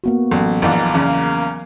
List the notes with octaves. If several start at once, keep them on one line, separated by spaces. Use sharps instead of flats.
A#3 B3 F#4
A1 F#3
A#1 E3 A#3 A#4 D#5 F#5
E2 C#3